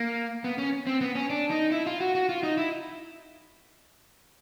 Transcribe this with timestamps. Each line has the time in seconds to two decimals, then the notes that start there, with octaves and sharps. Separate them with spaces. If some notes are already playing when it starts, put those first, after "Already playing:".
Already playing: A#3
0.44 B3
0.58 C#4
0.87 C4
1.01 B3
1.15 C#4
1.30 D4
1.50 D#4
1.72 E4
1.87 F4
2.00 F#4
2.15 F#4
2.29 F4
2.43 D#4
2.58 E4